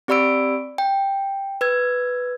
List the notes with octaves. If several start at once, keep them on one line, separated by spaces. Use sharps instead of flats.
C4 G4 D5 B5 E6 D7
G5
B4 E6 G#6